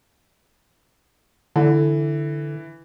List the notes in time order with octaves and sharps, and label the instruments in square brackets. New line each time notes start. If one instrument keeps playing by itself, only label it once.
[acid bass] D3 [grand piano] E3